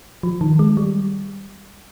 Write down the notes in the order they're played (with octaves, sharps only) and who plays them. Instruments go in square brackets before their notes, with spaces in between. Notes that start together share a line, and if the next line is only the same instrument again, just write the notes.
[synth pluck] F3
D#3
G#3
G3